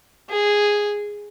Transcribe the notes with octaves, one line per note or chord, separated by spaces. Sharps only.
G#4